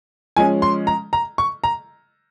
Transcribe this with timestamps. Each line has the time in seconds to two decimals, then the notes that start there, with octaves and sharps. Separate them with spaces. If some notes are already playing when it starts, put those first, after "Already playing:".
0.37 F3 G#3 C#4 G#5
0.62 C6
0.87 A#5
1.13 A#5
1.38 C#6
1.64 A#5